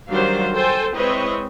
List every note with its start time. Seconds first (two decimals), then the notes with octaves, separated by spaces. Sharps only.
0.10 D#3 F#3 G3 D4 C5 F5
0.53 A4 C5 G5 G#5
0.94 G#3 C4 E4 B4 C#5 D#5